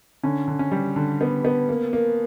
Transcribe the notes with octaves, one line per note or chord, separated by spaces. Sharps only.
D3 C#4
D3
C#4
G3
D3
B3
B3
A#3
A#3